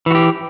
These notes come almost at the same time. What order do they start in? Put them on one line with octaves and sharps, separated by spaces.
E3 F#4 G4